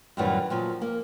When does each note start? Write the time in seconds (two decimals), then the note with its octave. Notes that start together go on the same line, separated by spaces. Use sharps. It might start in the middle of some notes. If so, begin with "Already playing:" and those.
0.17 F#2 A2 D#3 E3 F#3 G3
0.50 A#2 F3 F#3
0.82 A#3